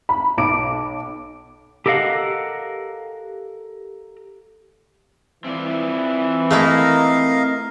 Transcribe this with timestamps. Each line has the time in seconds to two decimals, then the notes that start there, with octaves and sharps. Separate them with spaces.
0.09 B5
0.38 B1 D6 D7
1.86 G4 A4 A#4 D#5 F5 F#5
5.44 E3 C4 F4 D5
6.51 A3 A#3 E4 A#4 D#5 F5